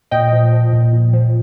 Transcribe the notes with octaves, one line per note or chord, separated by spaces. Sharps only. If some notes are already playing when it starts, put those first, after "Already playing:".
A#2 D#5 G5
F3
F3
A#2
A#2
F3